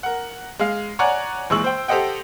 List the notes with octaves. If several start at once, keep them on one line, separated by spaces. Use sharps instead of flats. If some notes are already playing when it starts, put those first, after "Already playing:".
A#4 F#5
G#3 F5
C#5 D5 F#5 G#5 A#5 F#6
A#1 E3 G#3 C#6 E6 F#7
C5 G5
G4 A4 C5 D#5 F#5 G5